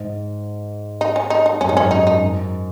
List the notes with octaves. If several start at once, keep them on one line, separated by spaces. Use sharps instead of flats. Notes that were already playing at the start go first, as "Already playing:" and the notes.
Already playing: G#2
D#4
C#4
D#4
D#4
F#2 C#4
D#4
G#2
C#4
F#2
D#4
D#4
F#2